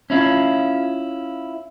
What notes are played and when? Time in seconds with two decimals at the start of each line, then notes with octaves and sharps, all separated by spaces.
0.10 C#4 E4 F4